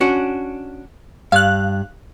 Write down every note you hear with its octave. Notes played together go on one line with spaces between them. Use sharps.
C#4 D4 F#4
G2 F5 F#6